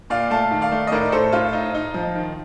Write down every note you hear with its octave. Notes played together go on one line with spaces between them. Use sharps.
A#2 D5 F5
A3 F5 A5
D#3
D5 F5
A3
D#5
A2 A#4 D5
A2 A4 C5
A2 F4
D#4
D#4
F3
D#3